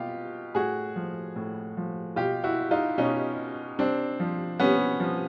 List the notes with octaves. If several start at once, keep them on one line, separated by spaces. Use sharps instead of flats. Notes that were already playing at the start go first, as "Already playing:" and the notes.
Already playing: B2 F4 G4
A2 F#4 G#4
F3
A2
F3
B2 F4 G4
E4 F#4
D#4 F4
B2 C#4 D#4
C3 C4 D4
F3
C3 B3 C#4
F3